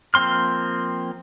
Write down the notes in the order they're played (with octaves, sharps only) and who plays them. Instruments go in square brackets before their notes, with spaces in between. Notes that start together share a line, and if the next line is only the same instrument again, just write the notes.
[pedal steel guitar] F3 A#3 C4 C6 F6